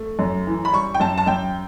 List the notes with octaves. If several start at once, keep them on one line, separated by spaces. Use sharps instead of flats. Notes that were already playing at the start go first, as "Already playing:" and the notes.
Already playing: A3
F#2
E3
B5
G3 C#6
G5
F#2 A5
A5
F#2 G5